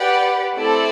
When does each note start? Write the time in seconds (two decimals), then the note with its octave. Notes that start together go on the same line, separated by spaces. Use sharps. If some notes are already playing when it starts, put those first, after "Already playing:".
Already playing: G4 B4 D5 F#5
0.56 A3 C4 E4 A4 D5